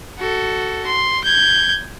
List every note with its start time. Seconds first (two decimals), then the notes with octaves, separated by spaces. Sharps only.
0.19 F#4 A4
0.87 C6
1.24 G6 G#6